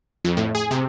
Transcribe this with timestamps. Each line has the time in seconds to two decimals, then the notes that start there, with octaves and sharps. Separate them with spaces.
0.25 F2
0.37 A2
0.55 G#4
0.71 C3